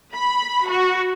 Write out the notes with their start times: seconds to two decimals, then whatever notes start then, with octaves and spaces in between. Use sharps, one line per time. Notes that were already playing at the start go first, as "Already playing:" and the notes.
0.12 B5
0.66 F#4